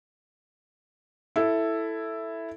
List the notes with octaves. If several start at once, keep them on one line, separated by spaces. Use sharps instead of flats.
E4 A4